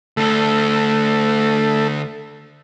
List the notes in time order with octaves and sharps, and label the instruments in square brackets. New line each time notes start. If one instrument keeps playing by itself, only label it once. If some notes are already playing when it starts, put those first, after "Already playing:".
[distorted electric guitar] D2 A4 [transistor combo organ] A3